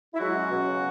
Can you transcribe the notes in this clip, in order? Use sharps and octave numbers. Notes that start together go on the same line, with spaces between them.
E4
F#3 G#3 F#4
C#4
B2
C#3